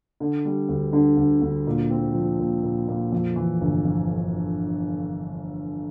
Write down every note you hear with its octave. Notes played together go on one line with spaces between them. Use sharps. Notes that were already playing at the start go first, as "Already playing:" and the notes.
D3
G3
D2
D3
D2
D2
A#2
C4
F3
A#2
A#2
A#2
F2
E3
G1
F2